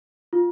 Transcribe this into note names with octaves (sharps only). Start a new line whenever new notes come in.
F4